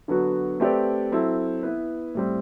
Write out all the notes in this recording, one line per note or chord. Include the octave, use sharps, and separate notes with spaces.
D3 F#3 B3 F#4
A3 C4 G4 B4 D5
F#3 C4 E4 A4
B3 E4 B4
A2 G3 C4